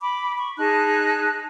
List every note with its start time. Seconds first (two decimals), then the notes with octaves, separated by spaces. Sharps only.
0.01 B5 D6
0.37 C#6
0.57 D#4 G#4 A5 F#6